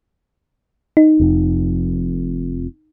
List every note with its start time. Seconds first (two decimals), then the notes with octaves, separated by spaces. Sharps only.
0.97 D#4
1.20 F1 F2